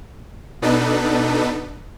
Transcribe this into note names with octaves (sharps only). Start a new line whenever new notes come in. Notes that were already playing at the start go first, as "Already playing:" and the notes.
B2 B3 D4 D#4 A4 B4